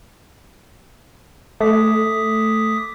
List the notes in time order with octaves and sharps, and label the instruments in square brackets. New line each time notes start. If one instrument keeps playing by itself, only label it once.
[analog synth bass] A3 [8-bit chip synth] D6 D#6 B6